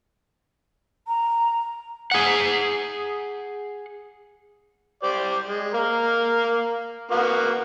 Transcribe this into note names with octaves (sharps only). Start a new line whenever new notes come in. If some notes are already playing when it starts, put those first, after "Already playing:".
A#5
G#4 F#5
G4 C5 D5
G#3
A#3 A#4
A#3 B3 F#4